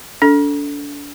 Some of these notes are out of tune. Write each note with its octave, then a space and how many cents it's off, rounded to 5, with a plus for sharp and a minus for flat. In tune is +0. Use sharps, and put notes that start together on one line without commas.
D4 -35 A4 +0